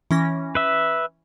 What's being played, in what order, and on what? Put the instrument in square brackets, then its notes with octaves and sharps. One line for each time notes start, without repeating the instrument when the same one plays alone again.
[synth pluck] E3 C#4 A#6
[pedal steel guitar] B4 E5